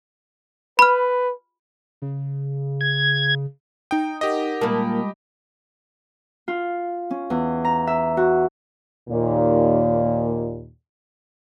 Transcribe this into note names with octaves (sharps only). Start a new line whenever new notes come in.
B4 B5 F6
C#3
G#6
D#4 G5 D#6
G4 A#4 D#5 F#5
A#2 G3 G#3 A#3 A5 B5
F4
C#4
E2
A#5
E5
F#4
D#2 A#2